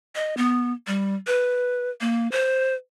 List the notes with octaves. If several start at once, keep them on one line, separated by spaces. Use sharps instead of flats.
D#5
B3
G3
B4
A#3
C5